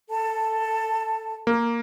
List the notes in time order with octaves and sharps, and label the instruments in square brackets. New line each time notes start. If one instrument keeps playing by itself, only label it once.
[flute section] A4 A5
[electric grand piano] A#3